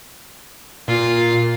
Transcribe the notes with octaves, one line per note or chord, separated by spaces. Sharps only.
A#2 F4